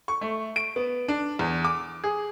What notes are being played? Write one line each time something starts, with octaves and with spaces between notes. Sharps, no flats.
C#6
A3
D7
B3
D4
E2
D6
G#4